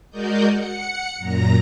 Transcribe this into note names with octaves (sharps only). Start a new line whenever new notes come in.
G#3 F#4 A#4 D5 D#5 G6
F#5 C#7
F#2 A#2 A#5 A#6